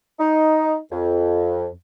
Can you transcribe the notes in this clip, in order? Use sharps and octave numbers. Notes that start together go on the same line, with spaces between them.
D#4
F2